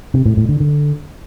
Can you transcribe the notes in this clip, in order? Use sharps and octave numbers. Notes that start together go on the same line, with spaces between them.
C3
A2
A2
D3
D3